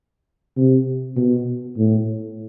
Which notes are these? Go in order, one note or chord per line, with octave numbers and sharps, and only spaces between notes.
C3
B2
A2